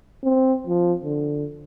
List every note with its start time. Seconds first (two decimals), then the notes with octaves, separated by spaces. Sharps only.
0.23 C4
0.67 F3
1.04 D3